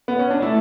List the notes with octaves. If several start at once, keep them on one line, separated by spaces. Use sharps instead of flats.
B3
C#4
D4
A3 E4